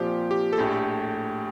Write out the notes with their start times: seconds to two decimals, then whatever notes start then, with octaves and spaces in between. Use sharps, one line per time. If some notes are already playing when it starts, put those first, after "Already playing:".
Already playing: A#2 F3 C4 F4 G4
0.31 G4
0.53 A4
0.58 A#1 A2 A3 G4